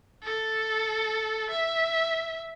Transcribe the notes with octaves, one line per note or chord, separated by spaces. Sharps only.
A4
E5